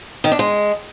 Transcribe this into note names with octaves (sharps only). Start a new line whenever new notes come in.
D#3
D4
G#3